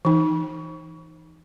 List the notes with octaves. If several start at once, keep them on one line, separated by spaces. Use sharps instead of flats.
E3 D#4